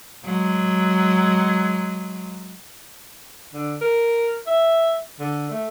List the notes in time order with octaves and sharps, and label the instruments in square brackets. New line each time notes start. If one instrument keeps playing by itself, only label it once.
[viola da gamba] F#3 G#3
[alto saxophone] D3
A#4
E5
D3
A3